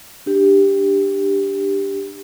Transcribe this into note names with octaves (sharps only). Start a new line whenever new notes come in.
D4 G4